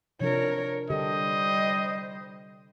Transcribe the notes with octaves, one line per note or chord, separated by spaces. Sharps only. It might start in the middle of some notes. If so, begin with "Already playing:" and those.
C3 F3 D4 A#4 C#5
D3 G3 G4 A4 C5 D#5